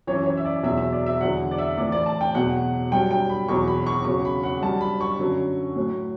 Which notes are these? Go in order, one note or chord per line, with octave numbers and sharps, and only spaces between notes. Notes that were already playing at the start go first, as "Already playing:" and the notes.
F#2 E3 C#5
C#5
E5
D5
E2 B2 F#3 E5
E5
D5
E5
E2 D3 F#3 F#5
D5
E5
A2 E3 D5
D5
A5
G5
E2 B2 F#3 F#5
G2 F#3 G5
G5
B5
E2 B2 F#3 C#6
B5
C#6
E2 C#3 F#3 C#6
B5
F#5
G2 F#3 A5
B5
C#6
F#2 D3 F#3
A2 F#3